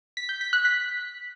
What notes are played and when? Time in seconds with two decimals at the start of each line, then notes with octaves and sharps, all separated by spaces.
0.17 B6
0.29 G6
0.41 B6
0.53 F#6
0.65 B6